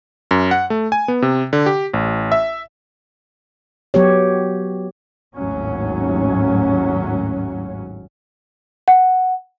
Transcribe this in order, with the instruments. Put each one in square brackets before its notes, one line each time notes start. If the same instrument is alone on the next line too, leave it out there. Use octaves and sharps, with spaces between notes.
[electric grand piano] F#2
F#5
A3
G#5
B3
C3
D3
G4
A1
E5
[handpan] F#3 B3 G4 C#5
[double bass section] G#1 D#2 A2 F#3 C#4
[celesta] F#5